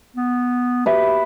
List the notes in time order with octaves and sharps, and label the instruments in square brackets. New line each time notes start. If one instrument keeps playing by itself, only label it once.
[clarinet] B3
[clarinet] G4 [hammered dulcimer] B4 E5